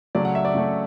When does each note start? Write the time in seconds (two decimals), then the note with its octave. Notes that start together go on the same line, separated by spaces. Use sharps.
0.15 C#3 F#3 A3 C#4 D5
0.25 F#5
0.35 E5
0.45 D5
0.54 C#3 F#3 A3 C#4